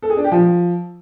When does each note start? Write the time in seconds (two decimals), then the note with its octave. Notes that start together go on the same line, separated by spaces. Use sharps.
0.03 A4
0.10 G#4
0.17 D4
0.24 G4
0.32 F3